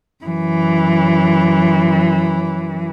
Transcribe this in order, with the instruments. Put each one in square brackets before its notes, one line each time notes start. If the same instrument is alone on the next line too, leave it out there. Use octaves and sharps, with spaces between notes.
[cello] F#2 E3